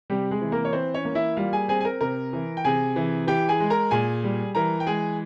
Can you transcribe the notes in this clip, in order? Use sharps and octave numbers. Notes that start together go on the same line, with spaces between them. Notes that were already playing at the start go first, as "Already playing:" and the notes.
C3 G3 G4
G#3 G#4
E3
A#3 A#4
C#5
E3 C4 C5
C#4 C#5
A#3
E4 E5
G3 F4 F5
G#4 G#5
C4 G#4 G#5
G#5
A#4 A#5
C3 A#4 A#5
E3
G5
C3 G#4 G#5
E3
E3 G4 G5
G#4 G#5
G#3
A#4 A#5
A#2 G#4 G#5
G3
E3 A#4 A#5
G5
G#3 G#4 G#5